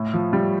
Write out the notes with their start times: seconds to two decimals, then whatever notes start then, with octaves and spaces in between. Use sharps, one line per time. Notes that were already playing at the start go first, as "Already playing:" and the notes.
Already playing: A2
0.14 F3
0.33 G3